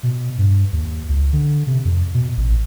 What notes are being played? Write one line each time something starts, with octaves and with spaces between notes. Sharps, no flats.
B2
G2
D#2
C#2
D3
C3
F2
B2
A1